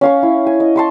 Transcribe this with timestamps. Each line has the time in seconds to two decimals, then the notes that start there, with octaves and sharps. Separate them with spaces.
0.01 C#4 F5 C#6
0.23 E4
0.47 G#5
0.60 D#5
0.76 A5 C6 C#6